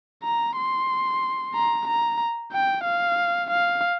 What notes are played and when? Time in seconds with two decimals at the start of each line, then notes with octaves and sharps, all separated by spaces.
0.23 A#5
0.57 C6
1.55 A#5
1.87 A#5
2.53 G5
2.84 F5
3.50 F5